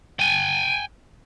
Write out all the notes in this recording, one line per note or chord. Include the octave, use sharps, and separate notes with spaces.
G5 G#5